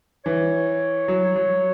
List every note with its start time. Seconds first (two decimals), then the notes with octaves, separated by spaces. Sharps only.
0.25 E3 C#5
1.08 F#3
1.36 F#3